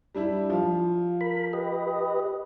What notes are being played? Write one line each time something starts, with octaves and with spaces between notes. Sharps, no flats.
G3 D4 E4
F3 F4 F5
A#4 B5
G4 B4 D#5